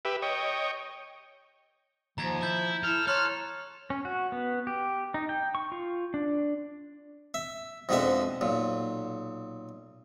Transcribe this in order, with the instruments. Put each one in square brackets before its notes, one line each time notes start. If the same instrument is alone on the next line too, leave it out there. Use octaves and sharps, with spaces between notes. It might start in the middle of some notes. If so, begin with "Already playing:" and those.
[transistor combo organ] G4 B4 E5
C#5 D#5 G5
[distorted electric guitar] D#2 [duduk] F3 [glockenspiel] A#5 G#6
[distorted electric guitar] E4 [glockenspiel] A#5 G6 G#6
[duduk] E4 [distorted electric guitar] A4 [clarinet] F6
[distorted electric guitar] A4 [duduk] C#5 [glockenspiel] A#5 C6 F#6 [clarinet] F6
[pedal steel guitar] C#4
F#4
B3
G4
D#4
G5
C#6
F4
D4
[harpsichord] E5
F2 G#2 B2 D3 F#4 E5
B1 A#2